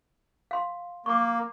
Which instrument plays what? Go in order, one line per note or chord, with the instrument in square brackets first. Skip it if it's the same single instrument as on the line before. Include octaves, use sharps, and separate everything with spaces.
[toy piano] F5 C6
[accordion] A#3 [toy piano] C#6 D6